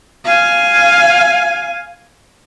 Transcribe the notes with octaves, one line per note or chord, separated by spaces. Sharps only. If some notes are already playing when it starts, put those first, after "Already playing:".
F5 G#5